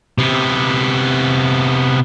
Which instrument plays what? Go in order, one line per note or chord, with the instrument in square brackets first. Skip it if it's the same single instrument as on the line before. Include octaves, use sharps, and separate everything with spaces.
[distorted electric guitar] C3 B3